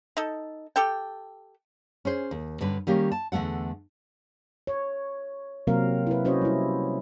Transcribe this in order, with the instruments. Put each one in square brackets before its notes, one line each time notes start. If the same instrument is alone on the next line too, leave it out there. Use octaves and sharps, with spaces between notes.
[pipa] D#4 A4
G4 A4 G5
[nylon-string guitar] C#4 G#4 C5
D#2
G2 D3 C#4 B4
D#3 G3 A#3 C#4 G4
A5
E2 D3 A3 A4 F#5
[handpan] C#5
C3 F#3 A#3 C4 A#4 F5
E4 B4
C#4 F#4 C5 C#5 D#5
G3 E4